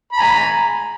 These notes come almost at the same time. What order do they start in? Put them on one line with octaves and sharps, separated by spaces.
B5 A#5 G#5